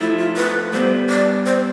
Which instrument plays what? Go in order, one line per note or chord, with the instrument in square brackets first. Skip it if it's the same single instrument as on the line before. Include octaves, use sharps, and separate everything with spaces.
[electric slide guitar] F3 A3 [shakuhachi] E4
[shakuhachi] F4
B4
[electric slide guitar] G3 B3 [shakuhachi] C5
[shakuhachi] D5
C5